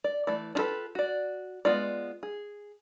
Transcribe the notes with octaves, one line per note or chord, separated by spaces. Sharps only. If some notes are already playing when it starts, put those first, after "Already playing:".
D5
E3 A3 D5
D4 F4 G4 A4 B4
F#4 D5
G#3 B3 F4 D5
G#4